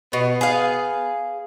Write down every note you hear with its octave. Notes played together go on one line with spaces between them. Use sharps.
B2 B3
G#4 F5